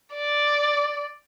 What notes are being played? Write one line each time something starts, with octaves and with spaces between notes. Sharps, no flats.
D5